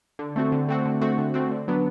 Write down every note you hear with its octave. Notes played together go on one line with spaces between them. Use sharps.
D3
A3 C4 F#4
D3
A3 C4 F#4
D3
A3 C4 F#4
D3
A3 C4 F#4
D3
F#3 B3 D4